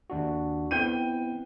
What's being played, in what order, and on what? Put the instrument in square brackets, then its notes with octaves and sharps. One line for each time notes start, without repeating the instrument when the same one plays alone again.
[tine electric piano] D#2 D4 F#4
[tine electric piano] B3 C4 E4 [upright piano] G5 G6 D#7